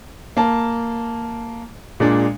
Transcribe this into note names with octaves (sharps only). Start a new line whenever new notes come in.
A#3 A5
A#2 G#3 D4